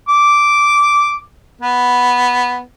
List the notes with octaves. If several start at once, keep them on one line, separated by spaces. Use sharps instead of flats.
D6
B3